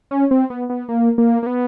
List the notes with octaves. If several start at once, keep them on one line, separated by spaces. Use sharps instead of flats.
C#4
C4
B3
B3
A#3
A#3
A#3
B3